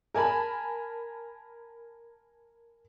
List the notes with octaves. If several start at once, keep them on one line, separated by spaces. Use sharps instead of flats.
A#4 G#5 A5 B5